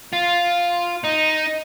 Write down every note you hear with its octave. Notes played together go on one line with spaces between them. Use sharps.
F4
D#4